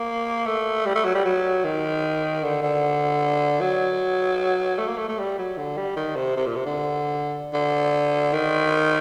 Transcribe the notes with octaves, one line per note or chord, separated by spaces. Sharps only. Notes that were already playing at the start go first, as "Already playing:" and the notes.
Already playing: A#3
A3
G3
A3
F#3
G3
F#3
D#3
D3
D3
F#3
A3
A#3
A3
A3
G3
F#3
D3
G3
D#3
C3
C3
A#2
C3
D3
D3
D#3